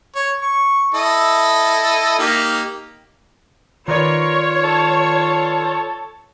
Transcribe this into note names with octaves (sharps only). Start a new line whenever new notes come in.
C#5
C#6
E4 A4 D#5
A#3 D#4 G4
D#3 F4 A#4 B4 C#5 D5
A4